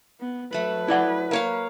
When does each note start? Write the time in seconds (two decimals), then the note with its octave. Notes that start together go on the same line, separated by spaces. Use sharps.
0.20 B3
0.53 F#3 A3 B4 B5
0.88 E4 D5 F#5
1.31 A#3 C#5 F5